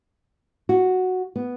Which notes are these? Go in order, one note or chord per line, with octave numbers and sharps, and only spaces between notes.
F#4
B3